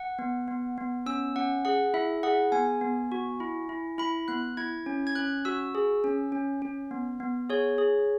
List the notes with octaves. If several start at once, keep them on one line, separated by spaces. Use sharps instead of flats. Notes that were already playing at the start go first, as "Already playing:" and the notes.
Already playing: F#5
B3
B3
B3
C#4 E6
C#4 F#5
G#4 F#5
E4 E5
G#4 F#5
B3 G#5
B3
F#4
E4
E4
E4 B5
B3 F#6
E4 G#6
C#4
G#6
C#4 F#6
F#4 E6
G#4
C#4
C#4
C#4
B3
B3
G#4 C#5
G#4